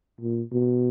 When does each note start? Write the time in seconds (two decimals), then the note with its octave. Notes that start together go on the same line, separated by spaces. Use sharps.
0.21 A#2
0.52 B2